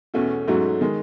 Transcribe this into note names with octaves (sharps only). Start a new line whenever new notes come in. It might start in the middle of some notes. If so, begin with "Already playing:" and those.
E2 B2 A3 C#4 F#4
G#2 F#3 A3 C#4 F#4
D#3 G#3